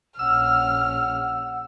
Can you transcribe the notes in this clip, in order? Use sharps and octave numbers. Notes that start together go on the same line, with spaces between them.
A#1 C#4 F#5 E6 F6